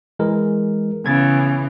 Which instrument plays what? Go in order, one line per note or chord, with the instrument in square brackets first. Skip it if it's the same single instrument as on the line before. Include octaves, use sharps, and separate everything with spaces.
[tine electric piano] E3 G#3 A#4
[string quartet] C#3 E3 [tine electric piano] B3 G#6 A6